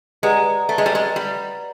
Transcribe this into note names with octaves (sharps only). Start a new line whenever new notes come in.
G#3 G4 B4 D5 F#5 A#5
A3
G#3
G3
G#3
G3